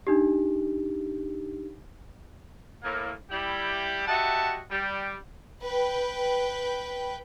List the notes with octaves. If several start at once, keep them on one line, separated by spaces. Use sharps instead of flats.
D4 D#4 G4
A2 A#3
G3 E4 G4
F#4 G4 D#5 E5 F#5 A5
G3
B4 G5